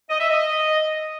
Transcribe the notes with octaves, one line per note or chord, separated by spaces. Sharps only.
D#5
E5
D#5